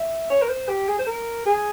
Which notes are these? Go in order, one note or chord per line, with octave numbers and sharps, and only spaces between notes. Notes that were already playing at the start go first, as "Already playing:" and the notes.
Already playing: E5
C#5
A#4
C5
G4
G#4
C5
A#4
G#4